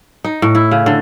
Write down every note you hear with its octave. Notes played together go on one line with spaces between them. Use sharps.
D#4
A2
E4
C#3
D3